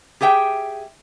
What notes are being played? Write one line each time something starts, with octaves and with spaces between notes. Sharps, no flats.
G4 G#4 E5 G5